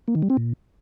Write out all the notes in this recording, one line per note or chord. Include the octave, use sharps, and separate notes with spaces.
A#3
D#3
G3
C4
A#2